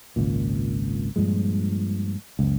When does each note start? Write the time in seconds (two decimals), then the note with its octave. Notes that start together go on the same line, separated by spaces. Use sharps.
0.16 G#1 C#2 A#2
1.16 G2 A#2 F3 G#3
2.39 F#1 C#2